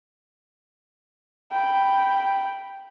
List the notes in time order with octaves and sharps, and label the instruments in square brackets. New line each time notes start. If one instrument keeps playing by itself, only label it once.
[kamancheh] G5 B5